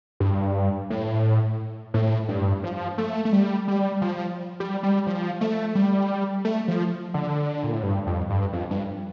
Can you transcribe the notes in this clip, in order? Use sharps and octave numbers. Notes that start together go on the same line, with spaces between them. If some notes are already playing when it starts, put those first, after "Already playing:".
G2
A2
A2
G2
F3
A3
A3
G3
G3
F3
G3
G3
F3
A3
G3
A3
F3
D3
A#2
A2
G2
F2
G2
F2
G2